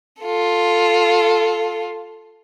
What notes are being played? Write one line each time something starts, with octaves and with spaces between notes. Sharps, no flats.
F4 A4